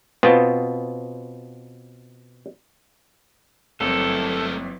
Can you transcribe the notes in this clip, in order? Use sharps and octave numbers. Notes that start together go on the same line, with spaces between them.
B2 B3 C4 F4
G1 E3 F#3 A3 C4 A4 A#4